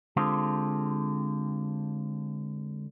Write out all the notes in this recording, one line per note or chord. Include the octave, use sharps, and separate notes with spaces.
D3 G#3 C4 F4 G4 A4